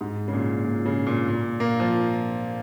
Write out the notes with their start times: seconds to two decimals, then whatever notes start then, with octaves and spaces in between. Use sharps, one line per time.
0.01 G#2
0.28 C#3
0.33 A#2
0.64 A#2
0.85 C#3
1.07 A#2
1.28 A#2
1.60 A#3
1.80 F3